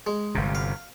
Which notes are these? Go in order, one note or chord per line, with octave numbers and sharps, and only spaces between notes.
G#3
G1 C3
F5